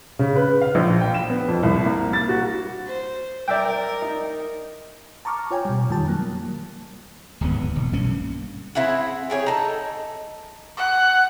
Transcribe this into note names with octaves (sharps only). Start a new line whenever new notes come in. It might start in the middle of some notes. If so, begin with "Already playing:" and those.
C#3
B4
F5
A#1
G5
E7
B3
F2
C2
A#3
A6
F#4
C5
A#4 D5 E5 G5
D#4
A5 A#5 C#6 D6 F6
F4 C#5 G5 G#5
B2 G3
F2 D#3 G3 F4 A5
F#3 A#3
D1 G#1 D#2 B3
E1
B1 G2 A#3 C#4
C4 E4 G#4 F#5
G4 G#4 C#5
D#4 A4
F#5